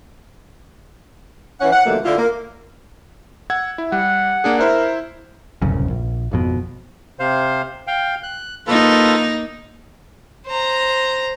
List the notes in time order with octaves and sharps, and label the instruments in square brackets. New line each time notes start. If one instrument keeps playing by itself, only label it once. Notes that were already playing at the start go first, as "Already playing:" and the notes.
[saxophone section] E3 C#4 F#5
F#5
B2 D3 F3 G3 A3 A#3
D3 E4 F4
A#3
[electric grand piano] F#5 E6 G#6
E4
[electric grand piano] G3 [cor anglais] F#5
[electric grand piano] A#3 D4 G#4
[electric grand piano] E4 C5 E5 [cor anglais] A#4
[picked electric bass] D1 C2 F#2 C#3
A#1
G#1 F2 B2
[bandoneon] C3 C5 F5
F5 G5
F#6
[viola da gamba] A#3 D#4 [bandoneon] F4 A4 B4
[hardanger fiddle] C5 A#5